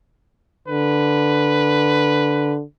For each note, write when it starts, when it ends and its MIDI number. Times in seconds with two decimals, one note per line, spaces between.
0.68 2.63 50
0.68 2.56 71